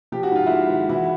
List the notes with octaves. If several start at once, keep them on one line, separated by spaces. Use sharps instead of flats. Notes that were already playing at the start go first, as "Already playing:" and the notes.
F3 G4
F#4
G#2 F4
G#3 E4 F#4
G#1
E3 E4 F#4